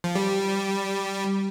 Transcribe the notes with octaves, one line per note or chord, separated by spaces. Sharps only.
F3
G3